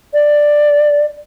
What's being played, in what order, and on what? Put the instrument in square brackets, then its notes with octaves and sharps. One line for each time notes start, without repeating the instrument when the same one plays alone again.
[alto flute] D5